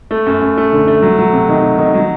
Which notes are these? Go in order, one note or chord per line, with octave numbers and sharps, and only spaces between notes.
A3
F#2
F#2
A3
D3
A3
F#3
F#3
C3
D#3
C3
D#3
F#3